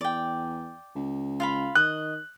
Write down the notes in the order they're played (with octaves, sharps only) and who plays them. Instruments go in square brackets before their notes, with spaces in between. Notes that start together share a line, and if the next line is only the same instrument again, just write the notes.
[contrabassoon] E2 [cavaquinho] D5 G5
[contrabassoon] C#2
[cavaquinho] F4 F5 B5
[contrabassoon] D#3 [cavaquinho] D#5 [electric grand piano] F#6